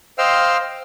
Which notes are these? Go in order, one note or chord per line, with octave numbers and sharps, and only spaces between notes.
C5 D#5 F5 G5 E6 F6